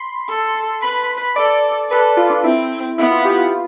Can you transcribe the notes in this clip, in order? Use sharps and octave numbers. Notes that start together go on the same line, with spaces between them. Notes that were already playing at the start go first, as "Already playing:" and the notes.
Already playing: B5 C6
A4
B4 B5
A4 D5
A4 B4
F4
D4
C4 E4
B3 E4
F4
G4
F4